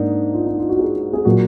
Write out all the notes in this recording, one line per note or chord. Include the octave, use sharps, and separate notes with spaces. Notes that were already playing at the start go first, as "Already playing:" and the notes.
Already playing: G#2 A#3 D4 D#4
F4
D#4
F4
F#4
G#4
G#4
A#2 F#3 A#3 F#4